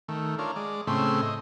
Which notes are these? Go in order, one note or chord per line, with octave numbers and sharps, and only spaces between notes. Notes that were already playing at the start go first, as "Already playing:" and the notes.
D#3 A3
D4 F4 A#4 C#5
G#3 D5
A2 C#3 A3 C4 E5 C6
D#5